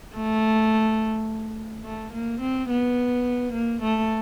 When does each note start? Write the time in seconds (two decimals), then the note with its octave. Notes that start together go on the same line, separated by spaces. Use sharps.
0.16 A3
1.84 A3
2.13 A#3
2.41 C4
2.70 B3
3.53 A#3
3.82 A3